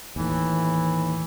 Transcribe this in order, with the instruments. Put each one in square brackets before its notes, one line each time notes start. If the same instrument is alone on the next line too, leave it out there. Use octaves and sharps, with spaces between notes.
[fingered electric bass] D#2 A2 [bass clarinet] E3